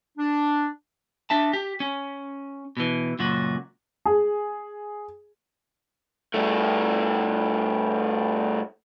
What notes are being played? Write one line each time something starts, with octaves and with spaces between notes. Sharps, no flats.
D4
D4 E5 A5
G4
C#4
B2 E3
C#2 F#2 A#2 F#4
G#4
G2 A3